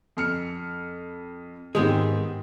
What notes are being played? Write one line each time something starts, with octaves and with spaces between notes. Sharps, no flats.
F2 F6 C#7
G#2 D#3 G#3 B3 C4 G4 G#4